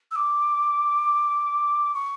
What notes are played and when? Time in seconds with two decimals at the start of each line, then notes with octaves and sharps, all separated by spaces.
0.11 E6
0.16 D6
1.94 C#6